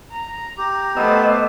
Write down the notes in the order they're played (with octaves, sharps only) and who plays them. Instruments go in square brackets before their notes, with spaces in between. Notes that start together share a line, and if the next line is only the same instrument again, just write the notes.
[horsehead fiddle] A#5
[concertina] G4
[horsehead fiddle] A3 C5 [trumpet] B3 [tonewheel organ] D#5 E6